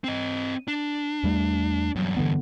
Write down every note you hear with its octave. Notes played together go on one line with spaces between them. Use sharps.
C4 D#5
D4
E2 G3 A3
E2 G2 F#3
D3 E3 B3